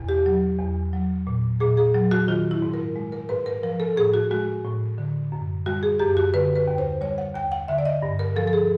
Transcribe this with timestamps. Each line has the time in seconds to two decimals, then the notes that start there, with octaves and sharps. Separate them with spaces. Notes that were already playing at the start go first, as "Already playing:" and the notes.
Already playing: E2 B2
0.09 G4
0.26 F#3
0.59 E2
0.93 F#3
1.27 A#2
1.60 A#2 G#4
1.77 G#4
1.95 F#3
2.11 F#4
2.28 D#3 F4
2.51 E4
2.62 G#2
2.74 A#4
2.96 G#3
3.12 A#4
3.29 G#2 B4
3.46 A#4
3.63 F3 A#4
3.80 A4
3.97 A2 G#4
4.14 F#4
4.31 G#3 F#4
4.65 A2
4.98 D3
5.32 F#2
5.66 G3 F#4
5.83 G#4
5.99 F#2 G4
6.17 F#4
6.34 D3 B4
6.56 B4
6.67 D#2
6.78 C5
7.01 G3 C#5
7.18 F#5
7.35 D#2 G5
7.52 F#5
7.68 D3 E5
7.79 D5
7.85 D#5
8.03 G2
8.19 A#4
8.36 F3 A4
8.47 A4
8.53 G#4